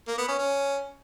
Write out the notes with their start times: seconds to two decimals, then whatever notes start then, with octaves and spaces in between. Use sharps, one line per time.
0.07 A#3
0.18 B3
0.28 C#4
0.38 C#4